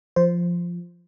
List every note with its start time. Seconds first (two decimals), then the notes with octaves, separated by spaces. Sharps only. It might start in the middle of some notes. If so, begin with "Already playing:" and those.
0.16 F3 C5